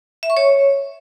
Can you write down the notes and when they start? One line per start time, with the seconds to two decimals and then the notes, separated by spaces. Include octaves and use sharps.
0.23 E5
0.30 C#6
0.37 C#5